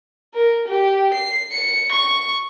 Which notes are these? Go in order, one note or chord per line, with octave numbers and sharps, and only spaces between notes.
A#4
G4
C7
C#7
C#6